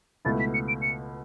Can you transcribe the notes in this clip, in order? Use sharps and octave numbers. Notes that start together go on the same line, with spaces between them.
C#2 B2 A3 E4 A6
B6
C#7
D7
C#7